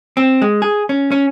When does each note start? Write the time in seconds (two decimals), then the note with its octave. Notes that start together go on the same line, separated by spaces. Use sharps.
0.17 C4
0.42 G#3
0.62 G#4
0.89 C#4
1.12 C#4